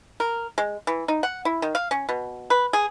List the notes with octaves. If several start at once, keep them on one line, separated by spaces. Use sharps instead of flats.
A#4
G#3
E3
D#4
F#5
E4
D#3
F5
C#4
B2
B4
G#4